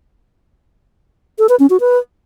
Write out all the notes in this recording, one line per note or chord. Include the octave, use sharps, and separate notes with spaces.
A4
B4
C#4
F#4
B4